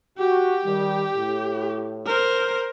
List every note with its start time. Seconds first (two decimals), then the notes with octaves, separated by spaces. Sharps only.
0.18 F#4 G4
0.64 D#3 G3
1.15 A2
2.06 A#4 C5